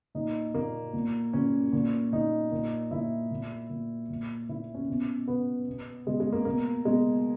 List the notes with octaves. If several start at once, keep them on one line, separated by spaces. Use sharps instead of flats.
A#2 D#4
A#2 A#3
A#2
A#2 C#4
A#2
A#2 D#4
A#2
A#2 E4
A#2
A#2
A#2
A#2 E4
C#4
B2
B2 B3
B2
B2 G#3
G#3
A#3
B2 A#3
B2 G#3